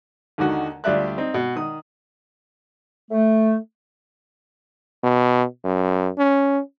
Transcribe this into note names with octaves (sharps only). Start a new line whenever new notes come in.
D#2 D3 D#3 F#4
D2 G3 F4 D5 E5 F#6
C4 D#4
B2
D#3 D#6
A3
B2
F#2
C#4